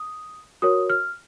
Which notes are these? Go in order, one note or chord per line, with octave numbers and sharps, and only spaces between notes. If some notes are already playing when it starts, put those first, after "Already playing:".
Already playing: D#6
F#4 A#4 C#5 D#6
F6